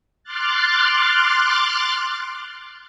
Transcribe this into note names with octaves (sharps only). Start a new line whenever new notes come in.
C6 D6 F6 F#6 A6